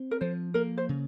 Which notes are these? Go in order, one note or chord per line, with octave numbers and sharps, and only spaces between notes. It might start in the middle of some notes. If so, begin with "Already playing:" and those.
Already playing: C4
A#4
F3 C5
A#3 A#4
C5
C#3